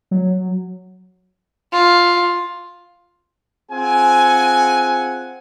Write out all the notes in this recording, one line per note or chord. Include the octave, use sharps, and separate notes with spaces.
F#3
F4
C4 F4 G#4 F#5 G#5